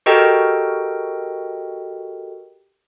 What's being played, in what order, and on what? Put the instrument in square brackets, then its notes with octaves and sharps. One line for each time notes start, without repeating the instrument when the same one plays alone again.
[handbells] F#4 G4 A4 A#4 D#5 G5